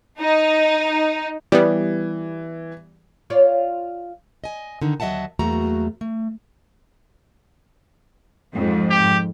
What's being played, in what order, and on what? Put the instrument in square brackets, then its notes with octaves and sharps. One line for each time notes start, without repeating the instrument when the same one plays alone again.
[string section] D#4
[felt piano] E3 [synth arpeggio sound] G3 B3
[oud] F4 C#5 D5
[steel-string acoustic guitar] D#5 G#5
D3 D#3 D#4
D#2 F#3 D#5 E5 F#5 A5
E2 F#3 A3 A#3 F#4 A#5
A3
[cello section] F2 G#2
[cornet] G4